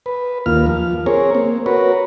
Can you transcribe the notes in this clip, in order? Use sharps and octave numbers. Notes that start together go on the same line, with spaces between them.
B4
D#2 A#3 F4 F6
F3
C4 G#4 A#4 C#5
A#3 C4
F#4 A#4 B4 C#5